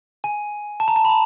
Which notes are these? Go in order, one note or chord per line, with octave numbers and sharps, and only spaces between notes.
G#5
A5
A#5
A5
B5
A#5